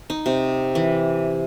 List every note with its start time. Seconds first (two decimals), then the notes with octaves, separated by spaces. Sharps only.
0.10 D#4
0.26 C3
0.75 E3